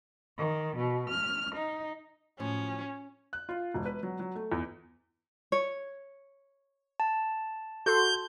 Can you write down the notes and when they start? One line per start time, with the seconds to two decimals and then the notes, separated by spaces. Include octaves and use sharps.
0.38 D#3
0.78 B2
1.10 F6
1.55 D#4
2.40 A2 F3 F#3 C#4
3.33 F#6
3.49 F4
3.74 E1
3.86 B4
4.03 F#3
4.20 F#3
4.35 A3
4.52 E2
5.52 C#5
7.00 A5
7.86 F#4 A4 C6 G6